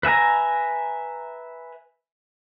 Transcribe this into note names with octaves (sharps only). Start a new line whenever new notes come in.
B4 E5 G#5 A#5